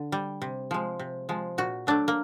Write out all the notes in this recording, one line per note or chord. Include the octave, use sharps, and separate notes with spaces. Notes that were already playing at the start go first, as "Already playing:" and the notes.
Already playing: D3
G3
C3
F3 G#3
C3
F3 G#3
A#2 F#4
F#3 A3 D4
A#3